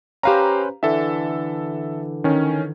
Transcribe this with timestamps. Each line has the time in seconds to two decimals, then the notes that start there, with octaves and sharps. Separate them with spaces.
0.23 C#4 G4 B4 C5 F5 A#5
0.83 D3 E3 A4 E5
2.24 D#3 C#4